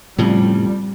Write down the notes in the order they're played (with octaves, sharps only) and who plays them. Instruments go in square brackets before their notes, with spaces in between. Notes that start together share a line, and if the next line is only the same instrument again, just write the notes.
[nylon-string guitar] F2 [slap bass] A2 C#3 F3 [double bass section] G3